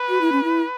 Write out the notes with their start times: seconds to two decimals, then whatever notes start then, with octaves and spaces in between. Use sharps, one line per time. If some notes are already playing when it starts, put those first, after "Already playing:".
Already playing: B4
0.09 F#4
0.21 E4
0.32 C#4
0.44 E4